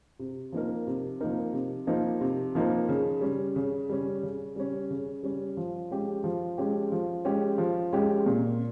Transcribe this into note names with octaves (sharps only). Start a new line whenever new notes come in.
C3
F3 A#3 D#4 A#4
C3
F3 A#3 D#4 A#4
C3
F3 A#3 D#4 A#4
C3
F3 A#3 D#4 A#4
C#3
G3 C#4
C#3
G3 C#4
C#3
G3 C#4
C#3
G3 C#4
F3
G#3 C#4 G4
F3
G#3 C#4 G4
F3
G#3 C#4 G4
F3
G#3 C#4 G4
A#2